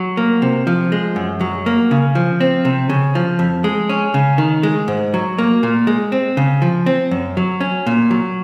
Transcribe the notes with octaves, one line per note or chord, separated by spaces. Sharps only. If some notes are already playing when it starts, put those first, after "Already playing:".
Already playing: F#3
A#3
C3
F3
G#3
F#2
F#3
A#3
C#3
F3
C4
C3
C#3
F3
F2
G#3
C#4
C#3
D#3
G#3
G#2
F#3
A#3
A#2
G#3
C4
C#3
F3
C4
F#2
F#3
C#4
A#2
F#3